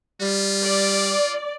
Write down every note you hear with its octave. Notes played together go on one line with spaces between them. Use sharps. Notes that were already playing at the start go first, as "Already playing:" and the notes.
G3 F4
D5